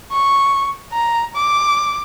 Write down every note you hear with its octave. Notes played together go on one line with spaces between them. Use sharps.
C#6
A#5
D6